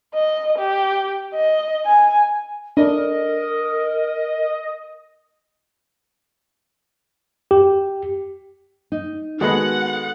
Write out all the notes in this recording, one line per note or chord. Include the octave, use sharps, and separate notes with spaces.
D#5
G4
D#5
G#5
D4 A#4 D#5
G4
D#4
D#3 G#3 B3 F#4 A4 F#5